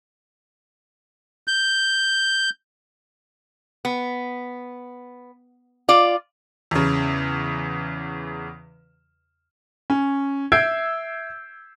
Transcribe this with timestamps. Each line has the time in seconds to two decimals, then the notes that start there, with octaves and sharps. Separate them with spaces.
1.48 G6
3.85 B3
5.89 F4 D5
6.71 E2 C#3
9.90 C#4
10.52 E5 E6 G6 G#6 C7 D7